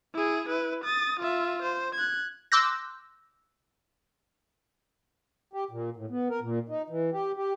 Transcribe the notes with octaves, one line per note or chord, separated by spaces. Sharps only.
E4 G#4
E4 B4
D#6 A6
F4 E5
C5
F#6 G#6
C6 D6 E6 F#6 G6 A#6
G4
A#2
A2
B3
A#4
A#2
D#4
E3
G4
G4